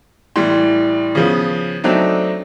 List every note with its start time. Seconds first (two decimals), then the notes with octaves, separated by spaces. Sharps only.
0.36 A2 E3 G3 C6
1.15 C#3 F3 B3
1.84 F#3 A3 C4 D4 D#4